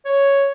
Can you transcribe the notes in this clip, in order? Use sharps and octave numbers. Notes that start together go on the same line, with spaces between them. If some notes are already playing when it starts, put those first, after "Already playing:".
C#5